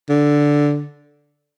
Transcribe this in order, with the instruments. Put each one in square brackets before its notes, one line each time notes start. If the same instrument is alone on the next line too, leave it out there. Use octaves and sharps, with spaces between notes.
[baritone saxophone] D3